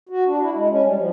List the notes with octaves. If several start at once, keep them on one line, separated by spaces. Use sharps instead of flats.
F#4
D4
E4
G#3
C#4
G3
F3